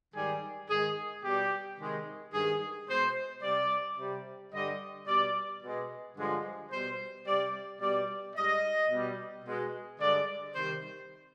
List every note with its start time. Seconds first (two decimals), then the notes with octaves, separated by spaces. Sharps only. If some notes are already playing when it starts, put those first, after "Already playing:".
0.14 G#2 D#3 G3 G#4
0.69 G#2 D#3 G#3 G#4
1.24 B2 G3 G4
1.78 C3 D#3 G#3
2.33 G2 D#3 G#3 G#4
2.88 B2 G#3 C5
3.43 C3 G3 D5
3.98 C3 G3
4.52 G2 D3 G3 D#5
5.07 B2 G3 D5
5.62 B2 G#3
6.17 G2 D3 F3 G#3
6.71 B2 G3 C5
7.26 C3 G3 D5
7.81 B2 G3 D5
8.36 G#2 G3 D#5
8.90 B2 G3
9.45 B2 G#3
10.00 G2 D3 G#3 D5
10.54 C3 D#3 G3 C5